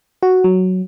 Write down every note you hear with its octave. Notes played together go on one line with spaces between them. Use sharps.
F#4
F#3